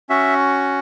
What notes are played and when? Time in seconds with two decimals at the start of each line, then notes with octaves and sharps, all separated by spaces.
0.09 C#4 F#4 E5